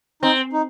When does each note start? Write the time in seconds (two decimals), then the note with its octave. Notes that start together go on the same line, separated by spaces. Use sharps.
0.22 C4 D#4
0.53 D#4